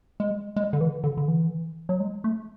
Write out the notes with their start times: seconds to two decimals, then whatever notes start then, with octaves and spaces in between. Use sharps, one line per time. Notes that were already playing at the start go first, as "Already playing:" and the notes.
0.20 G#3
0.56 G#3
0.73 D3
0.81 E3
1.04 D3
1.17 D3
1.28 E3
1.89 F#3
2.00 G#3
2.24 A3